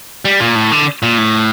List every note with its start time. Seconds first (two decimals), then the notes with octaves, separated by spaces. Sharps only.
0.25 G3
0.40 A#2
0.55 A2
0.72 D3
1.02 A#2
1.18 A2